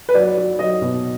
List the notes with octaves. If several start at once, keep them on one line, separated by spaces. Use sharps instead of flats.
B4
F#3 D5
F#3
F#3 D#5
B2